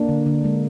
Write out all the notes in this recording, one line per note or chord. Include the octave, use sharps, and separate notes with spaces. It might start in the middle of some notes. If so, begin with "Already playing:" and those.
Already playing: A#3 D4
D3
D3
G#3